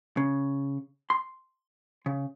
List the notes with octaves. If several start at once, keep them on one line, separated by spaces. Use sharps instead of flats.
C#3
C6
C#3